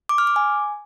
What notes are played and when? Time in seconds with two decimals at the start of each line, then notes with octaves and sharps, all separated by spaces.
0.09 D6
0.18 F6
0.27 D6
0.36 G#5